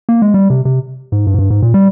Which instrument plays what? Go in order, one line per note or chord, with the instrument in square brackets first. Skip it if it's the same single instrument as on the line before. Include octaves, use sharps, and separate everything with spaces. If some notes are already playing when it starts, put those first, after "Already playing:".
[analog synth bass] A#3
G#3
G3
C3
C3
G#2
G2
G#2
G2
G#2
A#2
G3